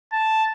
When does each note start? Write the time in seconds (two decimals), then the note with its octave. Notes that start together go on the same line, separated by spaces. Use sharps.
0.12 A5